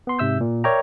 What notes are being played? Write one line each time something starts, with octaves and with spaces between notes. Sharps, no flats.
B3 C6
G#2 C3 E5 E6 G6
A#2
A#4 C#5 D5 E5 G5 A#5